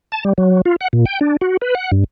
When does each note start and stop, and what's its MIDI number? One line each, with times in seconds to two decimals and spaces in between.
0.12 0.24 81
0.25 0.33 55
0.38 0.61 54
0.65 0.76 65
0.81 0.88 78
0.93 1.05 46
1.06 1.19 79
1.21 1.37 62
1.41 1.57 66
1.62 1.75 71
1.75 1.91 78
1.92 2.04 43